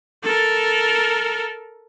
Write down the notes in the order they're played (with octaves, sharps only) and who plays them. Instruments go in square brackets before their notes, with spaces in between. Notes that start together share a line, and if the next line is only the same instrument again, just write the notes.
[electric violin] A4 A#4